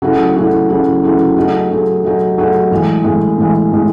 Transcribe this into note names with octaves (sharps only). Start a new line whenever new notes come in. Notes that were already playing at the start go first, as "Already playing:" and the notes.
C#3 F#3 A3 E4 G#4
C#3 F#3 A3 E4 G#4
C#3 F#3 A3 E4 G#4
C#3 F#3 A3 E4 G#4
F#3 A3 D#4 G#4
F#3 A3 D#4 G#4
F#3 A3 D#4 G#4
F#3 A3 D#4 G#4
A2 E3 G#3
A2 E3 G#3
A2 E3 G#3
A2 E3 G#3